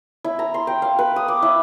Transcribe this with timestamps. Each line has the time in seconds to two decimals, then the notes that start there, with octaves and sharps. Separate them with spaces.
0.24 E4
0.39 A#5
0.54 C6
0.67 G5
0.82 F5
0.99 B4
1.16 D#6
1.28 D6
1.42 E4